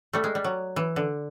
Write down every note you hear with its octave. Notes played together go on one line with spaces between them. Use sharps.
G3 A3
G#3
G3
F#3
E3
D3